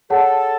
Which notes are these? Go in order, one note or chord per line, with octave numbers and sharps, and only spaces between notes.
G#4 A4 C#5 F#5 A5